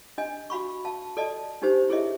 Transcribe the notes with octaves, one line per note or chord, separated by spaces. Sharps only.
D4 D#5 G#5
F#4 F5 B5 C#6
F5 A5
A4 D5 D#5 A5
D4 D#4 G4 C5
E4 G#4 A4 C#5 D#5 E5